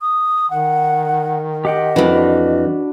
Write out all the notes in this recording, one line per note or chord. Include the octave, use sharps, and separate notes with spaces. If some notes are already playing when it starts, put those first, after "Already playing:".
D#6
D#3 F#5
G4 D#5 F#5 G5
F2 E3 D4 F#4 B5